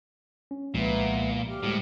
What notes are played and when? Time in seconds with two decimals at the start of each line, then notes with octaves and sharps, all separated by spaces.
0.51 C#4
0.74 C2 A#2 F3 G#3 B3 E4
1.48 D2 G4 F5
1.63 A2 G3 G#3